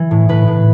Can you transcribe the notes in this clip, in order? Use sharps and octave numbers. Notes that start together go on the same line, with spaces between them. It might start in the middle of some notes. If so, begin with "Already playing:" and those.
Already playing: E3
A2
A2 B4
A2